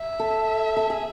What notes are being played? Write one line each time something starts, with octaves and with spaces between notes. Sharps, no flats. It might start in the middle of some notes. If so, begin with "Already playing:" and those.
Already playing: E5
A4
A4
G#4